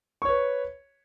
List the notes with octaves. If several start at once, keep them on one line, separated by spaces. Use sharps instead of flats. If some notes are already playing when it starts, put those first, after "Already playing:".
B4 C#5 C#6